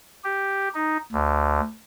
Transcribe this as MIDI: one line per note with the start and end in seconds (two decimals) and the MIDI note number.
0.24 0.68 67
0.74 0.97 63
1.12 1.60 38